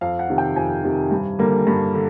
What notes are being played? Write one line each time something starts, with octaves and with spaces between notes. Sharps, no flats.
F2 F5
F#5
C3 D#3
G5
F2 G#5
C3 D#3
G2
D3 G3 A#3
G2
D3